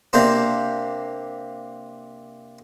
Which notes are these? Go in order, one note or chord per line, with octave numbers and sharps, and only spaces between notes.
C3 A#3 D4 C5